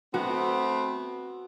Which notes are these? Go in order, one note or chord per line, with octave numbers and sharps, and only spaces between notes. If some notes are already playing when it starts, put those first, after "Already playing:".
A3 B3 C4 F#4